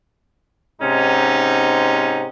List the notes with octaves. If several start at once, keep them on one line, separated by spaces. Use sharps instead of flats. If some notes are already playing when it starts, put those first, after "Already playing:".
G#2 C3 C#4 D#4